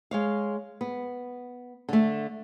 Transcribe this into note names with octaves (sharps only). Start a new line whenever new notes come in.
G#3 C#5 F5
B3
D3 A3